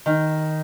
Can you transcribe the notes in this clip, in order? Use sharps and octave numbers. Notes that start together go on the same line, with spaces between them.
D#3